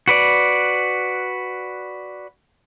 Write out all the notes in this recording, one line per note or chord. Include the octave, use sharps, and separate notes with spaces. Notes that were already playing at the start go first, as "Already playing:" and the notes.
F#4 B4 D5